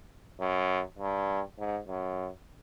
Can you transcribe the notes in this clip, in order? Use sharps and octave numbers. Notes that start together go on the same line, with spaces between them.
F#2
G2
G#2
F#2